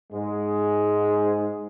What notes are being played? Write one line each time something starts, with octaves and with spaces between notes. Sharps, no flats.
G#2 G#3